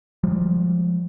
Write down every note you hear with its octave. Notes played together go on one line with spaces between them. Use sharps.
F3 G3 G#3